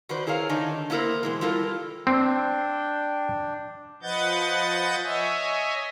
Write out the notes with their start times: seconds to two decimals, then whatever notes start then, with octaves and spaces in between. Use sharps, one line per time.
0.09 D#3 F#4 B4 C5 D5
0.27 E4 G#4 A#4 C#5 F5
0.49 D3 D#3 D4 D#4 G#5
0.90 A#3 B3 E4 A4 A#4 C5
1.23 B2 E3 G#3
1.41 G3 E4 F4 A4 A#4
2.07 C4 D4 G5
4.03 F3 B4 D#5 F#5 G6 A6
5.03 C#5 D#5 E5 G#5